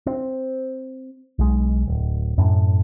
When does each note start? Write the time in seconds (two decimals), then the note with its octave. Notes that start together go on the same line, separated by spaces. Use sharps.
0.06 C4
1.39 B1 G#3
1.87 D1
2.38 F#2 A2